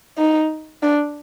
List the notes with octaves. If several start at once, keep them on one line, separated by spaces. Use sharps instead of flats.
D#4
D4